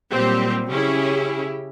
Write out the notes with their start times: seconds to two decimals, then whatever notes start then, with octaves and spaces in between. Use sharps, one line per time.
0.12 A#2 F#3 G3 C4 G4
0.71 C#3 C#4 E4 G4 G#4